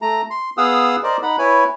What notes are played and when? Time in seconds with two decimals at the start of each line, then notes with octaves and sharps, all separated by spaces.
0.02 A3 A#5
0.31 C6
0.57 B3 G#4 F5 F#5 D#6 E6
1.03 A#4 C5 D5 D#5
1.23 D#4 F#5 B5
1.39 E4 B4 C#5 G#5